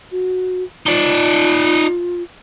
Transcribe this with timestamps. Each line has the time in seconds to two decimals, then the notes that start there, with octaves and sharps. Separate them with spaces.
0.11 F#4
0.86 D#4 F4 D5